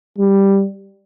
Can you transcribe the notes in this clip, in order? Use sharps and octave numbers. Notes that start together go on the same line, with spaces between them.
G3